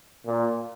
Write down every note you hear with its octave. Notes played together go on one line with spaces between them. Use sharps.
A#2